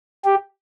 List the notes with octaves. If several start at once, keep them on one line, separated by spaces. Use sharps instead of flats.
G4